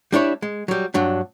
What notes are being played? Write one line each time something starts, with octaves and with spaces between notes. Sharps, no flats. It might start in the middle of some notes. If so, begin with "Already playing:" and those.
G3 D4 E4 C#5
G#3
F#3 G3
G2 F#3 D4